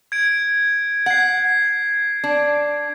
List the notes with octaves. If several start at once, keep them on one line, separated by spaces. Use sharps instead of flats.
G#6 D7
F#5 G#6 C7
D4